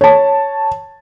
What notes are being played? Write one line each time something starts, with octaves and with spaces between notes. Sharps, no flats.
C#5 A5